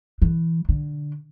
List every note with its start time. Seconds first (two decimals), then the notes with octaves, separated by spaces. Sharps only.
0.22 E3
0.69 D3